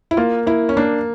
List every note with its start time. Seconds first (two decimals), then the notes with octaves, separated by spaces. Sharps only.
0.11 E4
0.17 A#3 F4
0.46 A#3 E4
0.69 C#4
0.77 A#3 D4